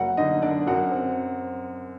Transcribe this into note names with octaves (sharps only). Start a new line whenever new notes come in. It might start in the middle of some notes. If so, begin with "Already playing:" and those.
Already playing: F#1 F#4 F#5
D3 D#4 D#5
D3 D4 D5
F#2 F#4 F#5
C4